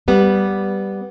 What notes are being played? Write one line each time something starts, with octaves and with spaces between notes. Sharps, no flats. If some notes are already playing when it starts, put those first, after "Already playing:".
G3 B3